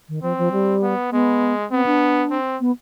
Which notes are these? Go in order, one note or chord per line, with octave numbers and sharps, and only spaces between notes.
D#3
F3 C4
F3
G3
B3
G#3 B3
B3 C4
D4
C4
B3